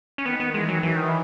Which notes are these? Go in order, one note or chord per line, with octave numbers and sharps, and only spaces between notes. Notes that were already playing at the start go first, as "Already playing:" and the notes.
C#4
D#3 B3
B3
E3 G#3
F#3
E3 F#3
D#3
E3